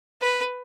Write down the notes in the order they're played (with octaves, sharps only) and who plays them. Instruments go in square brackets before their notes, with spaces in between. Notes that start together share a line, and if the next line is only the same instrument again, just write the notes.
[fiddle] B4